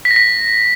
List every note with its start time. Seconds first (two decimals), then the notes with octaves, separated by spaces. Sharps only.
0.05 B6
0.11 A#6
0.16 B6